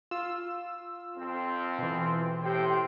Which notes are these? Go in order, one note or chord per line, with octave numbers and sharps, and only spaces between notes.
F4 E6
F2 C4
B2 E3
A2 G4 C5 G5